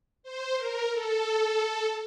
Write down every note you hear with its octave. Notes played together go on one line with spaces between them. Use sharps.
C5
A#4
A4